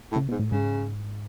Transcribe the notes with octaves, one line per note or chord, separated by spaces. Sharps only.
A2
C#3
G#2 B2
A2
G#2 C#3